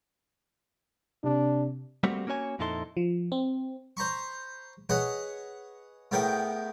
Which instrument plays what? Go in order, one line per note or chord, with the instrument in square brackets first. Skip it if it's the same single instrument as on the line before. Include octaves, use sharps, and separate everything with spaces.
[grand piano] C3 [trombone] D4
[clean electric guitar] G3 A3 A#3 C4 F#4 G4
A#3 C#4 F#4 C#5 G#5
F2 A#2 D#4 E4 A4 C6
[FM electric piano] F3
C4
[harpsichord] C5 A#5 B5 C#6
G#4 B4 C#5 D#5 F#5
A2 B3 G#4 A#4 G5